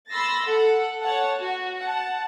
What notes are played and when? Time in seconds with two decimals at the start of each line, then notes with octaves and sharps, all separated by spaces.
0.12 B5 C6 E6 A6 A#6
0.47 A4 F#5
1.02 C#5 F#5 A5
1.42 F#4
1.77 F#5 A5